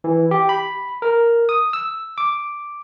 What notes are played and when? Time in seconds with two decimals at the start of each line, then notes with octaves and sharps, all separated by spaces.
0.04 E3
0.31 G4
0.49 B5
1.02 A#4
1.49 D#6
1.73 E6
2.18 D6